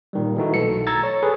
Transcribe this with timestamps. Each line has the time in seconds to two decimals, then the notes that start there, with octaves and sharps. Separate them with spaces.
0.13 A#2 D#3 G3
0.37 E3 A3 D#4 F#4
0.54 B1 A4 C#7
0.87 A#5 E6 G#6 A6
1.03 C#5
1.23 G#4 A4 B4